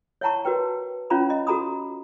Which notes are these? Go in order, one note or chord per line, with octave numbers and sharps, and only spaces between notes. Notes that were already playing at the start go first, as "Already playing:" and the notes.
C#5 E5 F#5 A5 A#5 C#6
F#4 A#4 B4 G5
C#4 F4 C#5 F5 A#5 B5
D#5
F#4 A4 A#5 B5 D#6